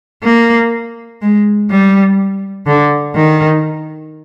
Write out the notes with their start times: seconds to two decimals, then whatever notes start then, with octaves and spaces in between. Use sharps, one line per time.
0.24 A#3
1.22 G#3
1.70 G3
2.67 D3
3.15 D#3